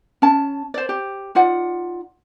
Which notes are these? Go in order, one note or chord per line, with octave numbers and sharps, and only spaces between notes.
C#4 A5
C5 D5
G4
D#4 F4 D5 F#5